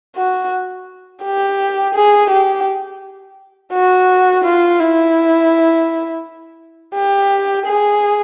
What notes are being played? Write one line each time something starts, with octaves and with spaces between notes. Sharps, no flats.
F#4
G4
G#4
G4
F#4
F4
E4
G4
G#4